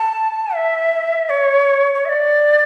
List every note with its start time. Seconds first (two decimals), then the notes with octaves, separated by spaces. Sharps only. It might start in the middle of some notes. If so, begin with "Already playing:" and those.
Already playing: A5
0.55 E5
1.30 C#5
1.95 C#5
2.05 E5
2.09 D5